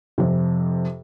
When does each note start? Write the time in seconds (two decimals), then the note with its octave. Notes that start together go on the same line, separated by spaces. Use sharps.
0.18 F2 C3